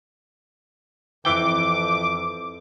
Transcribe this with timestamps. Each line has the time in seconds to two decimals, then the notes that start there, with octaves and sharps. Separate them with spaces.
1.25 F2 E3 G5 D6